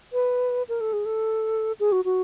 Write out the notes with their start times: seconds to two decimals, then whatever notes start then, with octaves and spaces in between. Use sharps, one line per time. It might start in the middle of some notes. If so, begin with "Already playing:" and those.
0.13 B4
0.69 A#4
0.81 A4
0.93 G#4
1.05 A4
1.80 G#4
1.92 F#4
2.05 F#4